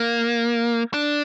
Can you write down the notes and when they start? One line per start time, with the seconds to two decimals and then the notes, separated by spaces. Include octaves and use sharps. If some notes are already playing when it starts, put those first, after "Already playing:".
Already playing: A#3
0.94 D4